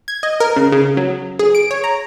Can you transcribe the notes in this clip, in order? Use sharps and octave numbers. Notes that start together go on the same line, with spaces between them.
G#6
D#5
A#4
C#3
C#3
F#3
G#4
D7
C#5
A#5